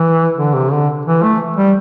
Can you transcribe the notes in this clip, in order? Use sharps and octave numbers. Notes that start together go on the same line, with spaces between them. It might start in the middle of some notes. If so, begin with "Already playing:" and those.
Already playing: E3
D3
C3
D3
E3
A3
G3